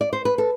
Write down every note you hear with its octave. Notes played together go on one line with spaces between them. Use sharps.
D5
C5
B4
A4